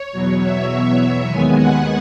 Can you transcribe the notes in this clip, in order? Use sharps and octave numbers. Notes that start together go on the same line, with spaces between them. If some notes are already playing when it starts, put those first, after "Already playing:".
Already playing: C#5
E2 B2 F#3
E5
E5
D#2 D#3 G#3 B3 G#5
F#5